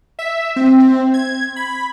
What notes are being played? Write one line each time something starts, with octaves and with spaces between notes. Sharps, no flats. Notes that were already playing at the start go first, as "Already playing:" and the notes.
E5
C4
C4
G#6
B5